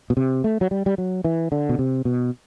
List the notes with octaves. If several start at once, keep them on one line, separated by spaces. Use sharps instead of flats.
B2
C3
A3
F#3
G3
G3
F#3
E3
D3
B2
C3
B2